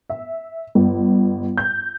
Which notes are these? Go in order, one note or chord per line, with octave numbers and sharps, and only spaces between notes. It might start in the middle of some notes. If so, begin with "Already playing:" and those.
E5
G1
G6